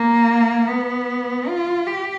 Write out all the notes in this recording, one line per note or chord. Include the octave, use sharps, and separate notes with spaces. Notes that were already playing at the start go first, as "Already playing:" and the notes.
Already playing: A#3
B3
F4
G4